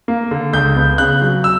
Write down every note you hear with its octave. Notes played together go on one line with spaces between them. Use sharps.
A#3
D3
C#2 G6
B3
C#3 F#6
F#3
E6